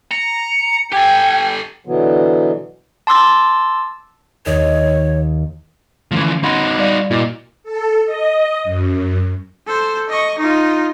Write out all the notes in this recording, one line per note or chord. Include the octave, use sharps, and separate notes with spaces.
A#5 C#7
G4 A4 G5 G#5
B2 D3 E3 F#3 B3
A5 C6 D6 E6 A6
D#2 C#5 D#5
D3 E3 F3 A3 C#4
D#4 F#4 F#5 B5 C6
G3 D5 F5
A#2 E4 F#4 D#5
A4
D#5
F#2
A4 C5
D#5 C#6
D#4 F4